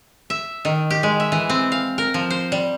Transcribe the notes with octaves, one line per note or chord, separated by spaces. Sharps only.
E5
D#3
G4
G#3
E5
E3
C4
F5
A#4
F3
C5
G3